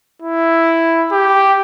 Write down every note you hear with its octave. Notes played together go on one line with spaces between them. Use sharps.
E4
G4